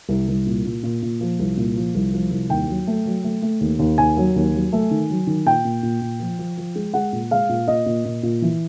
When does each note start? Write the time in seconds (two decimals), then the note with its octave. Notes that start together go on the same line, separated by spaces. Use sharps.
0.09 C2
0.28 C2
0.47 A#2
0.65 A#2
0.83 A#2
1.02 A#2
1.21 F3
1.39 C2
1.57 A#2
1.76 F3
1.95 C2
2.13 F3
2.31 C2
2.50 D#2 G5
2.68 F#3
2.87 A3
3.06 F#3
3.24 A3
3.42 A3
3.61 D#2
3.79 D#2
3.98 D#2 G#5
4.17 F#3
4.36 D#2
4.54 F#3
4.73 A3
4.91 D#3
5.10 F#3
5.27 D#3
5.46 A#2 G5
5.65 A#2
5.83 A#2
6.02 A#2
6.20 F3
6.39 F3
6.57 F3
6.76 G#3
6.94 G#3 F#5
7.12 A#2
7.31 G#3 F5
7.49 A#2
7.68 A#2 D#5
7.86 A#2
8.05 A#2
8.23 A#2
8.42 E3